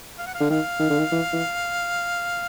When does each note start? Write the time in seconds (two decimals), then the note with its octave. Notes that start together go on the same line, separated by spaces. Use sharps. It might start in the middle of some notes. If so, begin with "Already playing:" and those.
0.18 F5
0.26 F#5
0.34 F5
0.40 D3
0.50 D#3 F5
0.80 D#3
0.90 D3
0.99 D#3
1.12 E3
1.33 E3